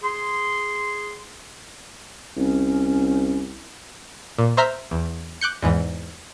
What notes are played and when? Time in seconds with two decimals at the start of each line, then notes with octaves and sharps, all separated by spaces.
0.03 G#4 C6
2.37 C2 C#4
4.39 A#2
4.57 C5 E5 A#5 F6 G6 B6
4.91 E2
5.41 D6 F#6 G6 C#7
5.62 E2 G#2 E3